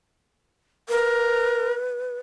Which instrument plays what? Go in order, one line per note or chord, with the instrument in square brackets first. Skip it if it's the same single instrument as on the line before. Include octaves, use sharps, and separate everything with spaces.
[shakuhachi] A#4 [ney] B4